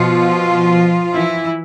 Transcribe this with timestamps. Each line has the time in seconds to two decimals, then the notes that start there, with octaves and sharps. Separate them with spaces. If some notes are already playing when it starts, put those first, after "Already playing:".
Already playing: B2 F3 F4
1.14 E3 E4